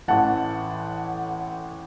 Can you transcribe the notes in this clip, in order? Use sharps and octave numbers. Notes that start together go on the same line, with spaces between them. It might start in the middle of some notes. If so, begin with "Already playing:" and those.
A1 A2 E3 F#5 A5